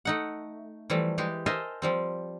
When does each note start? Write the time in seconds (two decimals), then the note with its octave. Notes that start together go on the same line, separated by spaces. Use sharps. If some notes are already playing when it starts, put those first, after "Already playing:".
0.05 A3 D#4 F#5
0.90 E3 F3 G3 A3
1.18 E3 G#3 G4
1.46 A#4 C5 D#5 E5 G#5 A5
1.82 F3 G3 C4